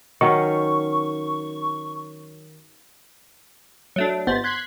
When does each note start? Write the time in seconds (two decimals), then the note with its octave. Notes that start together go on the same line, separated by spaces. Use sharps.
0.21 D#3 F#3 C#4 C#6
3.96 F#3 A3 D4
4.27 G1 B3 C5 A6
4.44 C6 F#6 G#6 B6 C7